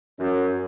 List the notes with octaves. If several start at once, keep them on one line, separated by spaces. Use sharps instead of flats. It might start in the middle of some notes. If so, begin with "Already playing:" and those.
F#2